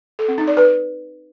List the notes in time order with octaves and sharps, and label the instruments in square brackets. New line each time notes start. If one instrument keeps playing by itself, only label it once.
[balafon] A4
C4
D#4
D5
B4